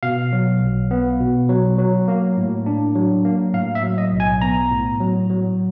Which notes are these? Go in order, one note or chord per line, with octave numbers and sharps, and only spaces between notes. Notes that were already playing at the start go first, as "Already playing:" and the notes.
B2 F5
F#3
B1
B3
B2
F#3
F#3
A#3
A2
D4
F#3
A#3
A2 F5
E5
F#3
D#5
B1
G#5
B3 A#5
A2
F#3
F#3